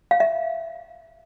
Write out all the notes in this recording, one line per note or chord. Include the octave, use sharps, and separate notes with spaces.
F5
E5